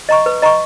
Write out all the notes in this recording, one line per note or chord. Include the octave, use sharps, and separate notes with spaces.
D#5 A#5 C#6
B4
D#5 A#5 C#6